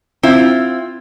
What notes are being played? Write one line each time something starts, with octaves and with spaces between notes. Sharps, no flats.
C4 E4 F4